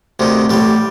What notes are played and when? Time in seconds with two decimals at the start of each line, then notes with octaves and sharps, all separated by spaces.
0.19 D2 C3 D#3
0.50 A1 A2 G3